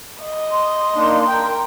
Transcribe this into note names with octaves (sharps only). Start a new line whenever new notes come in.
D#5
C6
A#3 D4 D#4
A#4 G5